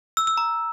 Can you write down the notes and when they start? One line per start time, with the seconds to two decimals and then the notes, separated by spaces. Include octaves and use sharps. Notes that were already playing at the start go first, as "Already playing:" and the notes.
0.17 E6
0.27 E6
0.37 A#5